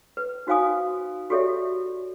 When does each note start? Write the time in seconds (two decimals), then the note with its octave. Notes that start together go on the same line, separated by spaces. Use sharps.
0.17 B4
0.47 D#4 F#4 C5 F5 G#5 D#6
1.30 F#4 G4 A4 C#5 D5 E5